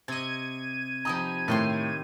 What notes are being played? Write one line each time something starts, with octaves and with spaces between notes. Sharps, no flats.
C3 D#5 G#6 D#7
F3 G3 D#4 A#5 D#6
A2 D#3 G4 C6